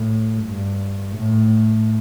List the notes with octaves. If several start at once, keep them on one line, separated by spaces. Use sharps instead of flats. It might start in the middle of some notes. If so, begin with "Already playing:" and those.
Already playing: A2
G2
A2